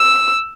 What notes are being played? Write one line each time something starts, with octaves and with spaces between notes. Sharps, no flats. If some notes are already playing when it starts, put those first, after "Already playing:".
Already playing: E6